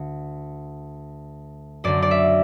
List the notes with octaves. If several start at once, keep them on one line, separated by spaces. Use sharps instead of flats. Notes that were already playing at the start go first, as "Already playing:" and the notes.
Already playing: D2 D3
F#2 D3 D5
D5
E5